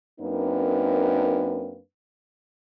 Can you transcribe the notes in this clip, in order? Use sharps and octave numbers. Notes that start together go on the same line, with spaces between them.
F#2 A#3 C4 D4 D#4 B4